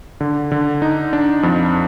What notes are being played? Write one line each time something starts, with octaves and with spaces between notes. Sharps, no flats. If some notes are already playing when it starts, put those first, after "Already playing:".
D3
D3
D#4
D4
F2